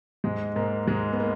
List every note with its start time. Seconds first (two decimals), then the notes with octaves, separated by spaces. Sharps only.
0.24 G#2 G#3
0.56 G#2 A#3
0.88 G#2 G#3
1.13 B3
1.20 A#3